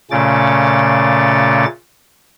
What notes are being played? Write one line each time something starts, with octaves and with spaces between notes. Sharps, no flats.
A#2 C#3 A3 C#4 D6 A6